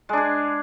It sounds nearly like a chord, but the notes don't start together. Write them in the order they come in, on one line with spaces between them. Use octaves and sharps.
G#3 D4 G#4